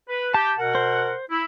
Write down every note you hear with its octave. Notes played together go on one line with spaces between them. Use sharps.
B4
G4 A5
B2 A#4 F#5
C5
E4